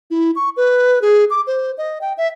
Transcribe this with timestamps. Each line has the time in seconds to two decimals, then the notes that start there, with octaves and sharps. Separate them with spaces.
0.11 E4
0.36 C#6
0.57 B4
1.02 G#4
1.30 D6
1.47 C5
1.78 D#5
2.01 G5
2.17 E5